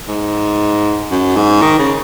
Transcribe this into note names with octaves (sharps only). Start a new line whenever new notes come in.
G#2
F#2
G#2
D#3
C#3